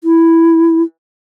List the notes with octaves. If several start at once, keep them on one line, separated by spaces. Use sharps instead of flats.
E4